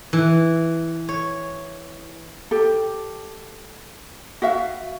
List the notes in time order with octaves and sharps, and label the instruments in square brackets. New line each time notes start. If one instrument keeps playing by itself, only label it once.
[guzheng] E3
C#5
[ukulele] G4 A4
F#4 E5 F5